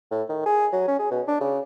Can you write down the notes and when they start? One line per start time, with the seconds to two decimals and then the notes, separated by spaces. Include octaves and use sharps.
0.11 A2
0.29 D#3
0.46 G#4
0.72 F#3
0.88 C#4
0.99 G#4
1.11 B2
1.27 D4
1.40 C#3